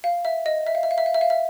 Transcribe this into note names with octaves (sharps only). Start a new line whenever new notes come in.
F5
E5
D#5
E5
F5
E5
F5
E5
F5
E5
F5
E5